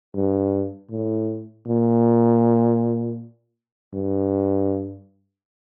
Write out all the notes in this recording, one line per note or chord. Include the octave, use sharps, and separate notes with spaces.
G2
A2
A#2
G2